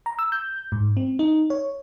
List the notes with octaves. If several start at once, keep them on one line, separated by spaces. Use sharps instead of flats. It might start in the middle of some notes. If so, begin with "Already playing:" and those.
A#5
E6
G6
G#2
C4
D#4
C#5